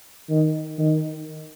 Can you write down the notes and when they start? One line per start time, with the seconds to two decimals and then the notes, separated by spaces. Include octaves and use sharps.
0.30 D#3
0.79 D#3